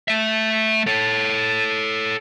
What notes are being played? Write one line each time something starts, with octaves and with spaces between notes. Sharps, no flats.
A3 E5
A4 C#5